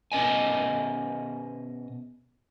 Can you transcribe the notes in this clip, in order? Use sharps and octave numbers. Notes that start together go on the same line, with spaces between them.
B2 C#4 D#5 G#5